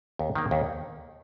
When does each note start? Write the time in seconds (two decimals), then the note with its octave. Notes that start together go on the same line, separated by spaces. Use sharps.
0.19 D#2
0.35 D#3 A#3
0.51 D#2